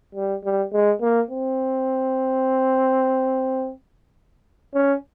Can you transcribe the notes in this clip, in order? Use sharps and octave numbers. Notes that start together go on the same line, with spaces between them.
G3
G3
G#3
A#3
C4
C#4